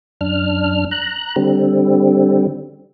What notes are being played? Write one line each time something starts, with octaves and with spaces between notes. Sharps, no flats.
F#2 D4 F6
A#5 F#6
D3 G3 C4